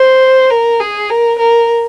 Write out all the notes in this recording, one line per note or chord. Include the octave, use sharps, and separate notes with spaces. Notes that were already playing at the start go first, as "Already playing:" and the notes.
Already playing: C5
A#4
G#4
A#4
A#4